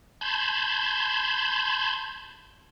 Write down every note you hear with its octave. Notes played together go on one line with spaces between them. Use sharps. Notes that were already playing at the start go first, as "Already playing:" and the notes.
A5 B5 C6 G6 G#6